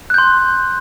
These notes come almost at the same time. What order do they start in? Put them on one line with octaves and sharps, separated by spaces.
F#6 G6 C6